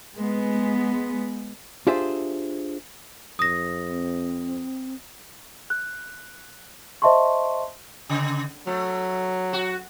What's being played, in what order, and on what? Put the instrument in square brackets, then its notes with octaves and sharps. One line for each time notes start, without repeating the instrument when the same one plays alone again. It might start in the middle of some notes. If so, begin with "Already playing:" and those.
[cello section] G#3 B3
[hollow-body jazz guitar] D4 F4 G4 G#4 C5 E5
[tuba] F2 [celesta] D#6 A#6
[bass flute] C4
[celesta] F#6
C5 D#5 E5 A5 C6 C#6
[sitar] C#3
[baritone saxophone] F#3 [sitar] A3
[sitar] F#4